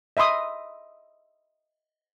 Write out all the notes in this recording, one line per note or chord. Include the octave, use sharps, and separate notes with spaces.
D#5 E5 B5 C6 D#6